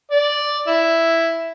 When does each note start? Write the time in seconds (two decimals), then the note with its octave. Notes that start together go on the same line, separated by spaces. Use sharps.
0.11 D5
0.67 E4